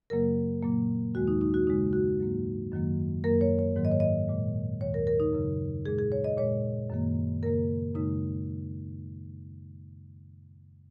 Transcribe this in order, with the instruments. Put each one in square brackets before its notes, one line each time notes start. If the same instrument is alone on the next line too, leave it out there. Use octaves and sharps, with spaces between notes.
[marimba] F#2 C#3 F#3 A#3 A#4
A#2 F#3 A#3
D#2 D#3 G#3 F#4
D#4
D#4
F#4
F#2 C#3 G#3 D#4
F#4
G#2 F#3 A#3
F#2 D#3 F#3 A#3
F#2 F#3 A#3 A#4
C#5
C#5
G#2 D#3 F#3 A#3
D#5
C#5
D#5
A#2 G#3
D#2 D#3 G#3 C#5
A#4
A#4
D#4
F#2 C#3 F#3
A#2 G#3 G#4
G#4
C#5
D#5
A#2 G#3 C#5
F#2 D#3 A#3
F#2 C#3 A#3 A#4
F#2 C#3 G#3 D#4